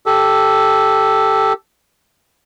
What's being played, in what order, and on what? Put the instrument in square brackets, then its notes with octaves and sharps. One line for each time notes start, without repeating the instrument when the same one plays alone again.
[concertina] G4 A4